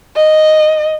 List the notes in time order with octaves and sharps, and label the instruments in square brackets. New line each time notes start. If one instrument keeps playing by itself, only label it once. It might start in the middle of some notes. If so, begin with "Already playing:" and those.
[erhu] D#5